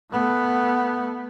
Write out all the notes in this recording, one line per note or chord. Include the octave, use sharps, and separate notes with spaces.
A3 B3